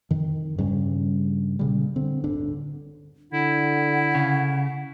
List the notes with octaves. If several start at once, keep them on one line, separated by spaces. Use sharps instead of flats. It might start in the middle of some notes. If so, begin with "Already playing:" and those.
F2 D#3
G2 C#3 G3 C#4
A#2 C#3 G3
D3 C4
D1 G1 D3 D4
D3 E4 F#5
C#3